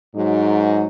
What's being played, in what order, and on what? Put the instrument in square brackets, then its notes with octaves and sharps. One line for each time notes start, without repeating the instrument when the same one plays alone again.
[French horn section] G#2 F#3 D#4